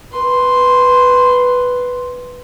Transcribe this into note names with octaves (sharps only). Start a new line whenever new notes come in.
B4 C6